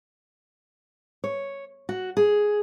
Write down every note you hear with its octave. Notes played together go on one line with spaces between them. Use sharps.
C#5
F#4
G#4